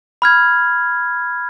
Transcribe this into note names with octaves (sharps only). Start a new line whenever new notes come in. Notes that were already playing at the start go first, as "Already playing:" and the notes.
B5 F6 G#6